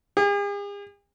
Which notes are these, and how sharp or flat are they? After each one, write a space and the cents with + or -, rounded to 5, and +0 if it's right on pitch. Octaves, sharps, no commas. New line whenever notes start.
G#4 -45